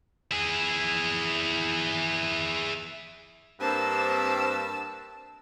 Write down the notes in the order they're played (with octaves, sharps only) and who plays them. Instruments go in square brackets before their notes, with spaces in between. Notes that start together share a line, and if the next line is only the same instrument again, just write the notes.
[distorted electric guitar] E4 G#4
[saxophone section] G2 A#3 C4 [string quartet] A5 E6